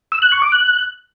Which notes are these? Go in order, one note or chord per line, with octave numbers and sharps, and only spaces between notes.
E6
F#6
C#6
D6
F#6